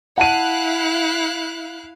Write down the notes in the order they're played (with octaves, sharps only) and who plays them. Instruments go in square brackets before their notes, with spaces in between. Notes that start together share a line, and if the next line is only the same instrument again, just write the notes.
[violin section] E4 F5 F#6 [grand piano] F#5 A5 D#7